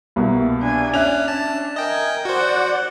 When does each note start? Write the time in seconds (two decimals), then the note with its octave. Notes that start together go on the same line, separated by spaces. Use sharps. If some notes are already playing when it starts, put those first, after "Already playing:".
0.16 C2 B2 A#3
0.60 D4 G#5
0.94 C#4 D5 E5 F#6 F7
1.28 C#4 D4 A5
1.76 A#4 D#5 G5 G#5
2.25 F#4 C5 D5 F#5